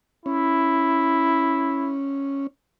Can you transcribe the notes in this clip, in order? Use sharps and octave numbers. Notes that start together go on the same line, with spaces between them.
C#4 E4